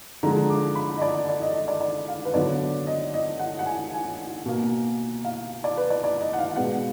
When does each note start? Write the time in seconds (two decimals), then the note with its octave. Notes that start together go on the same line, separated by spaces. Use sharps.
0.23 D3 F3 G#3 A#5
0.50 D6
0.75 B5
0.97 D#5
1.02 D5
1.29 D5
1.42 D#5
1.54 D#5
1.68 D5
1.81 D5
2.08 F5
2.25 B4
2.34 D3 F#3 B3 D5
2.87 D#5
3.14 D#5
3.40 F#5
3.59 F#5
3.66 G#5
3.93 G#5
4.46 B2 A#3
5.25 F5
5.64 D5
5.77 B4
5.90 D5
6.04 D5
6.21 D#5
6.33 F#5
6.39 F5
6.56 B2 G#3 B3 F#5